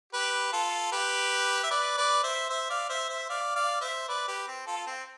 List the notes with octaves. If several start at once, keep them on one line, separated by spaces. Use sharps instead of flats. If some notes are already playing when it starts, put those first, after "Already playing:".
G4 B4
F4 A4
G4 B4
E5
B4 D5
B4 D5
C5 E5
C5 E5
D5 F5
C5 E5
C5 E5
D5 F5
D5 F5
C5 E5
B4 D5
G4 B4
C4
F4 A4
C4